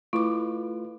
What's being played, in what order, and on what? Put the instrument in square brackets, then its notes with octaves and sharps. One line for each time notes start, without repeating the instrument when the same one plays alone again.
[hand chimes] A3 [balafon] E4 D6 [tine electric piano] F4 B4